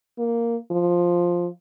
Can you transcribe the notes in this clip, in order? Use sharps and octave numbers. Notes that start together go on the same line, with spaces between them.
A#3
F3